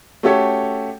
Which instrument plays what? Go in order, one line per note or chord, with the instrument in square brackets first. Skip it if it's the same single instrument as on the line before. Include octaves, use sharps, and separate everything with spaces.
[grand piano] A3 C#4 F#4 G4 A4 C#5